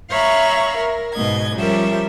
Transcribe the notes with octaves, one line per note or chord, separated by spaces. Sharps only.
C#5 E5 F5 A#5 B5 C#6
A#4
G#2 B2 D#5 G#6
F3 G3 C#4 G4 A#4 E5